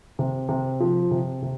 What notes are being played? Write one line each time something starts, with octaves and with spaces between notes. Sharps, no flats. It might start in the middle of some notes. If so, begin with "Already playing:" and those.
C3
C3
F3
C3
C3